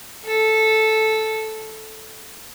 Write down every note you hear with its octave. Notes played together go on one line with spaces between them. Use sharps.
A4